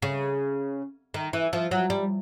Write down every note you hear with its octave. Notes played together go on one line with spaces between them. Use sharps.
C#3
D#3
E3
F3
F#3
G3